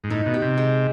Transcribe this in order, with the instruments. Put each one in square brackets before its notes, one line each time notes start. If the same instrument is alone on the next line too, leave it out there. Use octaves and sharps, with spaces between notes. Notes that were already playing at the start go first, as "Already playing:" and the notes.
[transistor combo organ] G#2
[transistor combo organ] A2 [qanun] D#4
[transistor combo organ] B2
[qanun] G4
[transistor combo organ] C3
[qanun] G#3